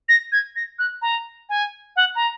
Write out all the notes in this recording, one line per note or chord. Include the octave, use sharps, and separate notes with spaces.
A#6
G#6
A#6
F#6
A#5
G#5
F#5
A#5